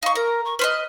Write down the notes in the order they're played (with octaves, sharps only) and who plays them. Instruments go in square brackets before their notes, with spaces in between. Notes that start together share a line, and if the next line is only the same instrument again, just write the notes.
[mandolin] D#4 C#6 [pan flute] F5
[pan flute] A#4 [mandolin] A#5
[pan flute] C#6
[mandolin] B4 C5 D#5 [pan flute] F6